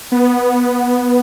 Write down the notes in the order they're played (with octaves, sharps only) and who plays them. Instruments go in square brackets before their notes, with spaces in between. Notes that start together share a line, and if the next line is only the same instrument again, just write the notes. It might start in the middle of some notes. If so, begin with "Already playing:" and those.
[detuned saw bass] B3